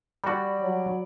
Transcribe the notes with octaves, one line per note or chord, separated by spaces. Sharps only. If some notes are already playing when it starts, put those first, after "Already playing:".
G3 F#4 D5 B5
F#3